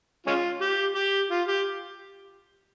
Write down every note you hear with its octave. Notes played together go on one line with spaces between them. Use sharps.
G#3 C#4 F4
G4
G4
F4
G4